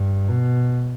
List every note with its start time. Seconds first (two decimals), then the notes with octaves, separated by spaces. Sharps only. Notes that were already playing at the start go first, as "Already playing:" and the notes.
Already playing: G2
0.29 B2